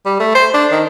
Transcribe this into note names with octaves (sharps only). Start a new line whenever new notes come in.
G3
A3
C5
D4
D#3